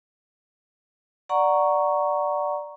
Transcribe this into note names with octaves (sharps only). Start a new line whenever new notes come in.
D5 F#5 A#5 C#6